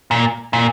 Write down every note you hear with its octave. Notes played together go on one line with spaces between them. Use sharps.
A#2
A#2